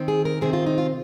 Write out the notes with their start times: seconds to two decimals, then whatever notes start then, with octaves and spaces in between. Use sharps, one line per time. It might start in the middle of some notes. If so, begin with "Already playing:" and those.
Already playing: D#3 C4
0.08 G#4
0.25 A#4
0.41 C3 D#3 C4 G#4
0.53 F4
0.66 D#4
0.78 F4